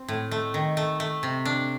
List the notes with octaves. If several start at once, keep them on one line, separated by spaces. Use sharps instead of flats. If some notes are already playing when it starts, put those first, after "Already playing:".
Already playing: C4
A2
A3
D#3
A3
A3
C3
D4